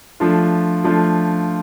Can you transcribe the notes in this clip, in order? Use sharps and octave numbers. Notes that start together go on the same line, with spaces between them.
F3 A3 D4 F4
F3 A3 D4 F4